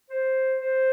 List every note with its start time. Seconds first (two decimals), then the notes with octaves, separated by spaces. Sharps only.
0.10 C5
0.60 C5